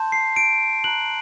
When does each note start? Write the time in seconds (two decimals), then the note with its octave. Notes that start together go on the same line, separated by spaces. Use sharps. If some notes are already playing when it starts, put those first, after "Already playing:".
Already playing: A5 C6 G6
0.12 C7
0.36 D7
0.84 A#5 F#6 F#7